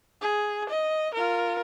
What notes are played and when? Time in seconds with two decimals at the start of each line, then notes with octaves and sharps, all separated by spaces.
0.21 G#4
0.69 D#5
1.14 F4 A#4